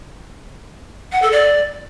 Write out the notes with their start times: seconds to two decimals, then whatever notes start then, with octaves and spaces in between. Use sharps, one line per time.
1.12 F#5
1.22 A4
1.32 D5